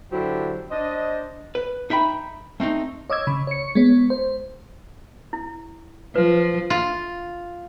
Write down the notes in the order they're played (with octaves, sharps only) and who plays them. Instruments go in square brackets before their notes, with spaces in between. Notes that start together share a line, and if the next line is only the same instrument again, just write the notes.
[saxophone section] D3 F#3 E4 G4 C5
D4 C5 D#5
[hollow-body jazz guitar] B4
D#4 E5 G5 B5
A3 C4 D4 D#4
[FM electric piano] C#5 D#5 D6 E6 G#6
C#3 B5
C#5 C#7
G#3 B3 C#5
C5
[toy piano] E4
[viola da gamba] F3 [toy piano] B4
[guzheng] F4